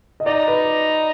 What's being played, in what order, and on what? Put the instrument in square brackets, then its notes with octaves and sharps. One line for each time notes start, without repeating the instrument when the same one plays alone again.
[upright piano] D#5
[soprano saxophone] D#4 [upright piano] D5
[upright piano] B4